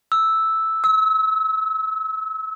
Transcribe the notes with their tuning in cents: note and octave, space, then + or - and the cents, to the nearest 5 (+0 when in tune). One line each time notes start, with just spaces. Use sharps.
E6 -5
E6 -35